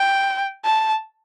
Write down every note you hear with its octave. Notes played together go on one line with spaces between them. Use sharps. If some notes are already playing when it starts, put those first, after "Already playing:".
Already playing: G5
A5